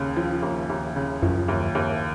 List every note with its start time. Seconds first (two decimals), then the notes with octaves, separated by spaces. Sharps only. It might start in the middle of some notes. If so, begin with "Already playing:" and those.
Already playing: D#2 C#3
0.16 F3
0.43 D#2
0.69 D#2
0.95 C#3
1.22 F#2 F3
1.48 D#2
1.75 D#2